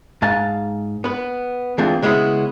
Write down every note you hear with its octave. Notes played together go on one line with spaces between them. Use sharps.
G#2 F5 A5
B3 B4
E3 G#3 A3 C4 D4 F4
C#3 G#3 B3 C#4 E4